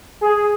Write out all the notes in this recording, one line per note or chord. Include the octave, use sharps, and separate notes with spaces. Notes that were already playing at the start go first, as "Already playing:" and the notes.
G#4